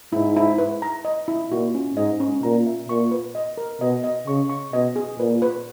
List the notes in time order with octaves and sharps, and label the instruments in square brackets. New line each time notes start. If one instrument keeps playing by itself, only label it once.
[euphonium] G#2 [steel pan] E4
[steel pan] E4
B4
A#5
D#5
E4
[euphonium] A#2 [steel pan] F#4
[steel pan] C#4
[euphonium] G#2 [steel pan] D#5
[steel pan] C#4
[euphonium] A#2 [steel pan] A#5
[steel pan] E5
[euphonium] A#2 [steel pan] C#6
[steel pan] B4
D#5
A#4
[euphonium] B2 [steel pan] D#5
[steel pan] D#5
[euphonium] C#3 [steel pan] C#6
[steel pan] C#6
[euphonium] B2 [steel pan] D#5
[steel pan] G#4
[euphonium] A#2 [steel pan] B4
[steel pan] B4